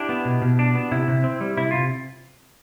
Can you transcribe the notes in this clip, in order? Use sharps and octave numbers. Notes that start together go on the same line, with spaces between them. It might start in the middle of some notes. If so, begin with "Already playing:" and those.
Already playing: D4 E4 G4
B3
B2
B2
D4
B3
C3 E4
C3
C4
G3
C3 E4
C3 F4